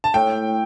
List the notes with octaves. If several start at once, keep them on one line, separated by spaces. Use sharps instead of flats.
A5
A2 G5